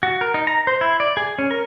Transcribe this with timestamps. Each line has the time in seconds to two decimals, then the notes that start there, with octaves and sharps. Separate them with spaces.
0.03 F#4
0.21 A#4
0.34 D#4
0.47 A#5
0.67 C5
0.81 E4
1.00 D5
1.17 G#4
1.38 C#4
1.51 A#4